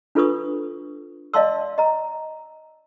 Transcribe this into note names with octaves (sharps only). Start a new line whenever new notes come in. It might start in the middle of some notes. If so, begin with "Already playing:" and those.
D4 F4 A4 B4 C#6 D#6
D5 D#5 F5 A5 C6 E6
D#5 A#5